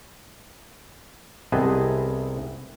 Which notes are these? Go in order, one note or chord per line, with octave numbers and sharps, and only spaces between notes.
C2 C3 B3 G#4 D#5 A5